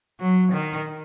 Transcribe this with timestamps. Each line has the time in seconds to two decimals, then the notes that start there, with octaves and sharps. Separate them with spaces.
0.20 F#3
0.52 D#3